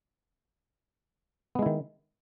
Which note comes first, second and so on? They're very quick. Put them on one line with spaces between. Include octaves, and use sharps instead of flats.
B3 G#3 E4 D#3